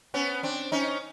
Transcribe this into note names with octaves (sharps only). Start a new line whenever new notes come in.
B3 C#4
C4 D4
C#4 D#4